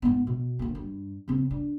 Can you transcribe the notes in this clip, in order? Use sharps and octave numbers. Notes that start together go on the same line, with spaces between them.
G#2 B3
B2
D2 A#3
G2
C#3 C4
D4